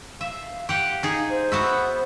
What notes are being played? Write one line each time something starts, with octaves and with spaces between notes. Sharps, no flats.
E5 F5
G4 F#5
D#4 G#4
C5
B3 F#4 E5